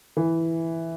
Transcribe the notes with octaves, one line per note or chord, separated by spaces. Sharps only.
E3